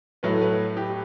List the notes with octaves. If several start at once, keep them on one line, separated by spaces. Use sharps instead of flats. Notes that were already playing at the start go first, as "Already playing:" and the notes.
A2 F#3 A3 B4
B4
G4